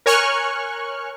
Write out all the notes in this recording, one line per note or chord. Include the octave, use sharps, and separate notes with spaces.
A#4 C#5 G#5 C#6 F6 F#6